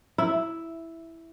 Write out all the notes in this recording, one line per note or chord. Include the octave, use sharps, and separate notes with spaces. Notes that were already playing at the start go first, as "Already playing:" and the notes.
E4